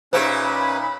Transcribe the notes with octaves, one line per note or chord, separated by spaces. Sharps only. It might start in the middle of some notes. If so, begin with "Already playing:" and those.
A#2 C#4 D#4 G4 B4 C5 E5
B5